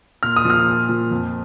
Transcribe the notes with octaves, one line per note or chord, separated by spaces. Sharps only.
A#2 F6
D#6
F3 F6
A#2
F3
F2